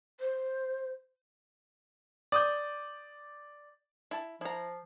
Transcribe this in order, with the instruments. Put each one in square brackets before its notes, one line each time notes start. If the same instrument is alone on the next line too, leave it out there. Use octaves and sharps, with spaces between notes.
[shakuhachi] C5
[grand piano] D5 D#6 G6
[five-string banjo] E4 A5
[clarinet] F3 [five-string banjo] E4 A#5